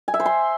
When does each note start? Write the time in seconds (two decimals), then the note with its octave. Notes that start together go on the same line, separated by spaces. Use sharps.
0.08 G#5
0.14 E5
0.20 C5
0.26 C6